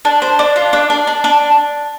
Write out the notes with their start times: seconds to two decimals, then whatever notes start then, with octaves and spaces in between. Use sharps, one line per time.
0.05 D4
0.22 C5
0.39 D4
0.56 F4
0.73 D4
0.90 D4
1.07 D4
1.24 D4